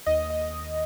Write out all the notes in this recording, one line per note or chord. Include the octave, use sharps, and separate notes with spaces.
D#2 D#5
D#5